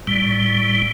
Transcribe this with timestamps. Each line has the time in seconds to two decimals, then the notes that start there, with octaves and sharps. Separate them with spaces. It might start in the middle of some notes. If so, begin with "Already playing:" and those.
0.07 A2 G3